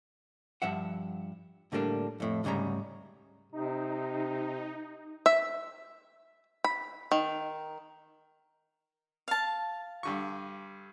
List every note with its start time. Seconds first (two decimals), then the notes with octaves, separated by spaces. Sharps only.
0.62 G2 F3 E5 F#5
1.72 A2 D3 G3 A#3 D4
2.20 F2 A2
2.44 D2 G#2 C#3 G3 A#5
3.53 C3 D#4
5.26 E5
6.64 B5
7.12 D#3
9.28 F5 A5
10.03 G2 D3 C#6